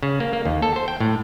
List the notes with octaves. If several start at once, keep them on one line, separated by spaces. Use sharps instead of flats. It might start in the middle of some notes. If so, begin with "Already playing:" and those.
C#3
A#3
A#3
D#2
A4
C5
G5
A2